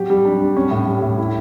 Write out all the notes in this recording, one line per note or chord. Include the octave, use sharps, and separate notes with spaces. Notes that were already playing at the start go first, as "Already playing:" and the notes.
Already playing: F#3 G4
G3
D4
G3
C#4
A2
G3
A2
E4